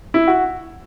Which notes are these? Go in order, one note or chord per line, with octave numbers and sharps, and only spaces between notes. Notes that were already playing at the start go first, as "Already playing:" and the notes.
E4
F#4